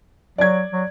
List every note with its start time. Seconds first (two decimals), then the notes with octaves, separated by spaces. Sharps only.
0.38 F#3 D5 G#6
0.72 F#3